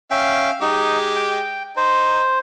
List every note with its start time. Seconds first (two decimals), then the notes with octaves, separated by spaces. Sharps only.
0.11 C#4 E5 F5 G5
0.61 G#3 D#4 G4
1.16 G5
1.77 D#4 C5